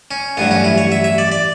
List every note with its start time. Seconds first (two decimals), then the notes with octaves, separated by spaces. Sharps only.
0.11 C#4
0.37 A1 G2 F#3 B3
0.51 C#4
0.64 E4
0.78 C#5
0.92 E5
1.04 E5
1.18 D5
1.32 D5